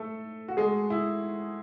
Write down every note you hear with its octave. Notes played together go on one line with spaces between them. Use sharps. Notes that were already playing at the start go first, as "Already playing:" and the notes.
Already playing: A3 A4
F#4
G#3 G#4
E4